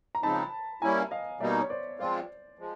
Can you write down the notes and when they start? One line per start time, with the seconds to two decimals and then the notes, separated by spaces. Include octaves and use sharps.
0.15 A#5
0.23 C#3 F3 G#3 C4 D#4 A5 B5
0.82 G3 A#3 C#4 E4 G#5 A#5
1.11 D#5 F5
1.40 B2 G3 A#3 D#4 D5 E5
1.61 C#5
1.70 C5 D5
1.99 F3 G#3 C4 F4 C5 D5
2.59 F3 G#3